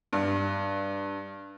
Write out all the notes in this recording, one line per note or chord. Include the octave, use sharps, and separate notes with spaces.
G2